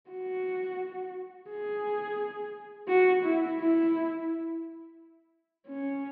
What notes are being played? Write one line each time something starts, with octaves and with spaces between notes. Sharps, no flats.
F#4
G#4
F#4
E4
E4
C#4